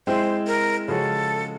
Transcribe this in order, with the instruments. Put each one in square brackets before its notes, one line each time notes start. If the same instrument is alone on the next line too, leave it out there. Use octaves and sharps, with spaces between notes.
[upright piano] G#3 C4 E4 [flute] C5
[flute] A#4
[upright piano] C#3 F3 G#3 C#4 F#4 [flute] A4